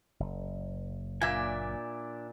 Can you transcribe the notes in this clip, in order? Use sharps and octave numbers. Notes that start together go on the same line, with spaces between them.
F#1
A#2 D4 D5 E5 G#5